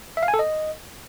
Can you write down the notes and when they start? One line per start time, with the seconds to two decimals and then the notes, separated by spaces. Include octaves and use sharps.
0.17 E5
0.23 F5
0.28 G#5
0.34 A4
0.39 D#5